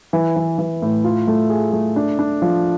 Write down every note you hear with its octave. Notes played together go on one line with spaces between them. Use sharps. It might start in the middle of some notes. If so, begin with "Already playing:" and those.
E3
E3
E3
A2
F4
A3
G#4
A3
D4
D4
F3